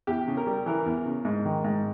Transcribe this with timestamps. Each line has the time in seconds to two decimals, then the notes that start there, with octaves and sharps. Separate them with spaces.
0.07 E2 G4
0.28 C#3
0.37 A#4
0.47 G3
0.66 E3 A#4
0.86 E2
1.06 C#3
1.25 G#2
1.45 D#3
1.64 G#2